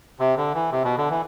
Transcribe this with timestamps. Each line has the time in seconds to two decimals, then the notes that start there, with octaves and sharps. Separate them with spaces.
0.19 C3
0.37 D3
0.55 E3
0.71 C3
0.84 B2
0.97 D3
1.10 E3